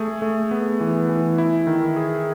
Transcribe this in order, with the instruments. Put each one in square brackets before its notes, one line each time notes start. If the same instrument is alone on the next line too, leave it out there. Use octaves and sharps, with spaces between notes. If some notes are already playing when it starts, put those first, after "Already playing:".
Already playing: [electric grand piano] A3 G#4
A3
B3
E3
E3
E4
D#3
G#4